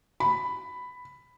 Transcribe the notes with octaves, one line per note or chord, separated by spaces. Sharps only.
B5